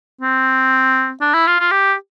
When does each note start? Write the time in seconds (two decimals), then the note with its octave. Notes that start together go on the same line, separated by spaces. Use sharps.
0.21 C4
1.21 D4
1.34 E4
1.47 F4
1.60 F4
1.71 G4